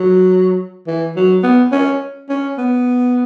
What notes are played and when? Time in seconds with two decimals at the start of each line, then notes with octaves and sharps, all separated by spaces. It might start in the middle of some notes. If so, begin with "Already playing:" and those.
Already playing: F#3
0.87 E3
1.16 F#3
1.43 B3
1.72 C#4
2.29 C#4
2.58 B3